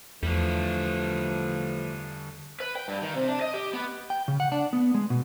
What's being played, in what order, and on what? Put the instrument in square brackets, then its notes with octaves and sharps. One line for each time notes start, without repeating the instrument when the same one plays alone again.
[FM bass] E2 [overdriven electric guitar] D3 G3 [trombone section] E3 F3 A3
[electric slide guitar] B4
G5
G2
D#3
C3
D4
D#5
G4
B3
G5
C#3
F#5
D4
B3
G#3
B2